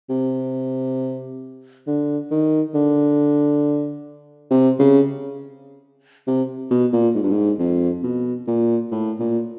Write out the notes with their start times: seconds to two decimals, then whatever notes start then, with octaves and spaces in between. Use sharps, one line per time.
0.10 C3
1.87 D3
2.31 D#3
2.74 D3
4.51 C3
4.80 C#3
6.27 C3
6.71 B2
6.93 A#2
7.15 G#2
7.23 G2
7.31 G#2
7.59 F2
8.03 B2
8.48 A#2
8.92 A2
9.20 A#2